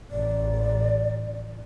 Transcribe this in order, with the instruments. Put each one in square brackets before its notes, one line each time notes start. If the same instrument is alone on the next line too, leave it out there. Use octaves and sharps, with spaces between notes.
[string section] A1 [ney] D5